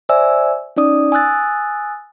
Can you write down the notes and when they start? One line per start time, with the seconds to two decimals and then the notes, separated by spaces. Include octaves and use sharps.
0.09 C5 D5 E5 G#5 E6
0.76 C#4 D#4 D5 D#6
1.12 G#5 D#6 E6 F#6 A6